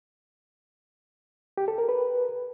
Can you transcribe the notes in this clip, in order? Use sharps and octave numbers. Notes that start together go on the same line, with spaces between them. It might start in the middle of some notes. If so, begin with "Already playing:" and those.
G4
A4
A#4
B4